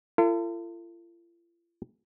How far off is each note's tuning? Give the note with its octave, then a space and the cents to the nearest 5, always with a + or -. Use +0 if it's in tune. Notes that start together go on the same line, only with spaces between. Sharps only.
F4 -45 A4 +40